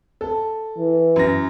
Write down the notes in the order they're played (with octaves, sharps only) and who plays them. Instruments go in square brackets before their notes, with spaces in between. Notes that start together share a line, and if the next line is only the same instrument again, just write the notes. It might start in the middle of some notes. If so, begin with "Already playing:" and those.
[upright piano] A4
[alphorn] E3
[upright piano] F#2 A#6